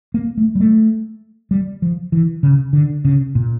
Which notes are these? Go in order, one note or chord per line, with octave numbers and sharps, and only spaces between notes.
A#3
A3
G3
A3
G3
F3
E3
C#3
D3
C#3
A#2